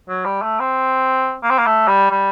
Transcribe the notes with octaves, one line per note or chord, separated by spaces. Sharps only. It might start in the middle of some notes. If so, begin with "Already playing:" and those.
F#3
G3
A3
C4
A#3
C4
A#3
A3
G3
G3